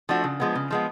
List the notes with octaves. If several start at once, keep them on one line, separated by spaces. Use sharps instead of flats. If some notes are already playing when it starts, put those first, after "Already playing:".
F3 A3 D4 F#4
C#3
F3 G#3 B3
C#3
F3 G#3 B3